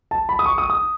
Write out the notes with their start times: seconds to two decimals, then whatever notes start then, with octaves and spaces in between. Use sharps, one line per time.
0.11 A5
0.29 B5
0.39 D#6
0.46 C#6
0.58 D#6
0.70 D#6